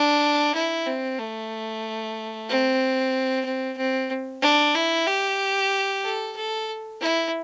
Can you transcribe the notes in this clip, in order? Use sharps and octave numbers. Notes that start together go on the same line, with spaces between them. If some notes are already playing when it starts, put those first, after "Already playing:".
Already playing: D4
E4
C4
A3
C4
C4
C4
D4
E4
G4
A4
A4
E4